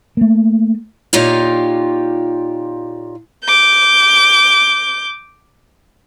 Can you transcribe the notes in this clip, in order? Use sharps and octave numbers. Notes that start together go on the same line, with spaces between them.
A3 A#3
A#2 D#4 F4 G4 C#5 F5
D6 G6